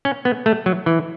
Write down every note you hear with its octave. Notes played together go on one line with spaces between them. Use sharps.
C#4
B3
A3
F#3
E3